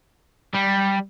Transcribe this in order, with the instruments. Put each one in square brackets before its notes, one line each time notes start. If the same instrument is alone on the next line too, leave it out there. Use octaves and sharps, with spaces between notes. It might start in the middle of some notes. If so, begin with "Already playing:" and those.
[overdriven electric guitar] G3